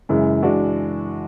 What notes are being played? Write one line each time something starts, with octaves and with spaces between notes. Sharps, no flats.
F#2 C#3 E3 G#3
E3 G#3 D4 F#4